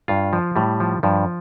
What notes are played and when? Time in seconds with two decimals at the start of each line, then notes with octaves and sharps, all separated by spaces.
0.08 G2 F4
0.33 F3
0.56 A2 G3
0.80 F3
1.03 G2 F3